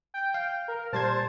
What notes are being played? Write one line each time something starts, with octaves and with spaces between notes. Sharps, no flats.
G5
F5
A#4
A#2 G3 C5 A5 G#6